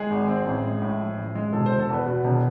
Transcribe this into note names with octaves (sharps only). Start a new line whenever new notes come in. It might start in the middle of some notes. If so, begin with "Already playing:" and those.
Already playing: G#3 G#4
G#1
C4
A1
G#3
A2
F3
A1
G#3
E1 A4
E1 C5
A4
E2 B4
B2
E1